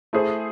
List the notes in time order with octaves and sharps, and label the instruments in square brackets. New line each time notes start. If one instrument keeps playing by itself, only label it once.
[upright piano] A3 E4 G#4 C5